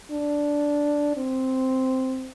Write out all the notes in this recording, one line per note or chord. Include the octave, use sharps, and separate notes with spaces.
D4
C4